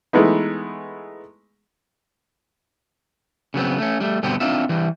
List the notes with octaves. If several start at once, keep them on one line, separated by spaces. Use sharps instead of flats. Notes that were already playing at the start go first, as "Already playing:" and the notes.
E3 G#3 A3 B3 D#4
C#3 F#3 B3 C4
A3 C#4
G3 A3
G2 B2 D3 B3 C4 G4
C4 D4 D#4 F4 E5
E3 G3